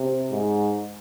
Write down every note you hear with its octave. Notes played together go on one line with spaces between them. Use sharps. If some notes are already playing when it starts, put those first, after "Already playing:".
Already playing: C3
G#2